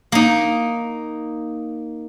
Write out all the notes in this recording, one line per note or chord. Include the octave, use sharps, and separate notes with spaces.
A#3 D#4